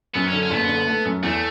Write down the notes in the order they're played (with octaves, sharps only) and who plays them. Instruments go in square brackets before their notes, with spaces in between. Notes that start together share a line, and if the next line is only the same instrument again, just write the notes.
[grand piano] F#2 [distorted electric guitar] B3
[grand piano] D3 [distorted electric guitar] C#4
[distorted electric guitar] C#4
[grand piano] F#1 [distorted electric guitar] A3
[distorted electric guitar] B3
[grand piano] D3
A3
F#2
[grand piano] E2 [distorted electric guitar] A3